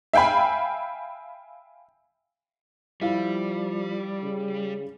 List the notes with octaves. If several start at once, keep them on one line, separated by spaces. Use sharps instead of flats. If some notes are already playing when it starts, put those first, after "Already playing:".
E5 F5 G5 G#5 B5
F3 G3 E4 F5
C#3